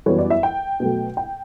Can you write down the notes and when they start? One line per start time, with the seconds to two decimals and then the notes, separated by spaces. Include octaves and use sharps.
0.06 F#2 E3 G3 B3 C#5
0.19 D5
0.30 E5
0.43 G5
0.80 B2 F#3 A3
1.17 G5